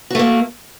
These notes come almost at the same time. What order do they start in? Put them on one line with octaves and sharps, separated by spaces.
F#4 A3 A#3